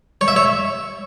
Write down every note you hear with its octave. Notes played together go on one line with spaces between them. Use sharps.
C#5
E5
C#5